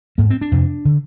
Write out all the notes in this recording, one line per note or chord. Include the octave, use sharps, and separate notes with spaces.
G#2 A#3
C4
D4
F2 C3
D3